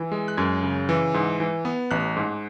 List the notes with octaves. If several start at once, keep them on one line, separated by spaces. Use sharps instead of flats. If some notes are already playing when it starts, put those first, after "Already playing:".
Already playing: E3 E6
G#3
F#6
F#2 G#6
C#3
E3
G#2
E3
B3
A1 F#6
G#2